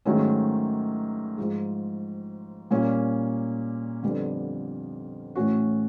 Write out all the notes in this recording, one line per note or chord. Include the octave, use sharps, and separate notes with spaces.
G#2 D#3 F#3 A3 C#4
G#2 F3 G#3
A#2 G3 A#3 C#4
F2 D3 G3 B3 D4
A2 E3 A3 C#4 F#4